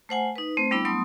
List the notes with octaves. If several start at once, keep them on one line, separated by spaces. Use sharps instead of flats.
A3 C5 F#5 G#5
D#4 B4
A3 C4 C5
G3 B3 D4 E4 B5
F#3 A3 B3 C6 D#6